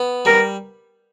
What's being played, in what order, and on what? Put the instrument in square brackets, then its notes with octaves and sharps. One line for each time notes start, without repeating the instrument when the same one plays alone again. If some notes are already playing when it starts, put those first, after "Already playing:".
Already playing: [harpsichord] B3
[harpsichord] G3 [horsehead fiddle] A#4